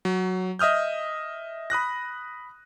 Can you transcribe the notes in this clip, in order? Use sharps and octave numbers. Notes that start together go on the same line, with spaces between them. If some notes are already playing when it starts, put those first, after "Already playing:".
F#3
D#5 E5 D#6 F6 G6
B5 D#6 F#6 A#6